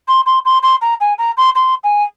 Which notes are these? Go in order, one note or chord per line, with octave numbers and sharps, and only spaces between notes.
C6
C6
C6
C6
A#5
G#5
A#5
C6
C6
G#5